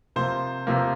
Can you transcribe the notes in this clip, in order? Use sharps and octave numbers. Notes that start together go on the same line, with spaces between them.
C3 F3 A#3 C5
C3 F3 A#3